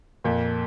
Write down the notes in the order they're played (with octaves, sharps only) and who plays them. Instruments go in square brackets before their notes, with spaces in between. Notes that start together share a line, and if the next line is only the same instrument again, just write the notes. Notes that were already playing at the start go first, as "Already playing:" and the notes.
[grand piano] F2 [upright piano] A#2 A#3